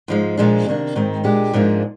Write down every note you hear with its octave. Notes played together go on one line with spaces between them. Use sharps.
G#2 F3 G#3
A#2 F3 G#3 D4
C3 D#3 A#3 D4
G#2 D#3 G#3 C4
A#2 G#3 D4 G4
G#2 F3 A#3 D4 G#4